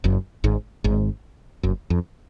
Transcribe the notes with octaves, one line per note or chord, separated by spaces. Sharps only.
F#1 F#2
G#1 G#2
G#1 G#2
F#1 F#2
F2